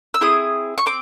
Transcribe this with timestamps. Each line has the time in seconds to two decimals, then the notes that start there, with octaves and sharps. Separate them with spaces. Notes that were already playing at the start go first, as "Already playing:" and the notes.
0.14 E6
0.21 C4 E4 G#4 D#6
0.78 C#6
0.86 C4 D6